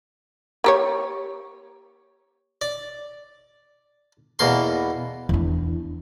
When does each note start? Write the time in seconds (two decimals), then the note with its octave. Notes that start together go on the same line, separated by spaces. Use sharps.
0.64 A#3 G4 C#5
2.62 D5
4.39 E2 B2 A#3 C6
5.29 E2 D4